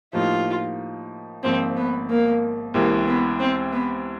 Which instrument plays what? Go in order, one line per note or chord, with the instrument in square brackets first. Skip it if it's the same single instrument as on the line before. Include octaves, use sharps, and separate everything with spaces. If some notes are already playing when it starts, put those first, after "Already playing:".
[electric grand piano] A2 F3 A#3 D#4 G4 [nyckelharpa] F4
[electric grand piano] G#1 G#2 F3 A#3 [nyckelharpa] C4
[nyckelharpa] B3
A#3
[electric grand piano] C#2 C3 E3 [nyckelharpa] A#3
[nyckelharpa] B3
C4
B3